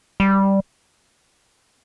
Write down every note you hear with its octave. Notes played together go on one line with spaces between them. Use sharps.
G3